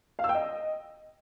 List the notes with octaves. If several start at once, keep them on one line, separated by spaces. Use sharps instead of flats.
F5
E6
G5
D#5